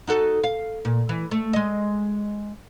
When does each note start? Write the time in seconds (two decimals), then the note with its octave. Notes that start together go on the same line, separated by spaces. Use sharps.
0.07 D#4 F#4 A4
0.43 F5
0.85 A#2
1.09 E3
1.31 A3
1.53 G#3 D#5